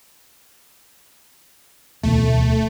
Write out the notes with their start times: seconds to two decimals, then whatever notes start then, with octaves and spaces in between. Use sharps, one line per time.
2.03 D1 E2 B2 A3